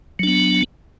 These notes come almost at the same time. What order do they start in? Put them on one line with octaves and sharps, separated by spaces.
F#3 D4 B3